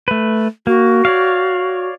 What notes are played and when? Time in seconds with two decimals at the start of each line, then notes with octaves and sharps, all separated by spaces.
0.08 A3 B4
0.67 A#3 F#4
1.05 C#5 D5 F5